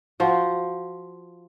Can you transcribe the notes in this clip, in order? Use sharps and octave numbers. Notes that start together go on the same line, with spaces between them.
F3 F#4